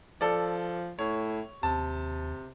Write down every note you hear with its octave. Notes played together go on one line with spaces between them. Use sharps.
F3 A4 D5
A2 C#5
D#2 C3 A5